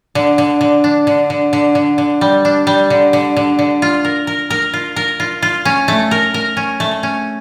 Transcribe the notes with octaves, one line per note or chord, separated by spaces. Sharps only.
D3
D3
D3
D4
D3
D3
D3
D3
D3
G3
D4
G3
D3
D3
D3
D3
F4
A#4
A#4
A#4
F4
A#4
F4
F4
C#4
A3
A#4
A#4
C#4
A3
C#4